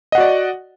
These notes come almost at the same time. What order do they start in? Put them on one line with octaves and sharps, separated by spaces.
D#5 F#5 F#4 D5